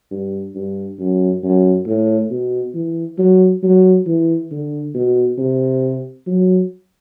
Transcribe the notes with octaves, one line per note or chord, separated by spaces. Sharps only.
G2
G2
F#2
F#2
A2
B2
E3
F#3
F#3
E3
D3
B2
C3
F#3